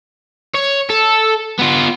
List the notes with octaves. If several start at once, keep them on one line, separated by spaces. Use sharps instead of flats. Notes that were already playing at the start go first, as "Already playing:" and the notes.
C#5
A4
B3 F4